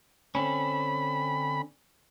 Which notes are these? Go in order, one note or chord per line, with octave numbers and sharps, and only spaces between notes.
D3 C4 C#4 B5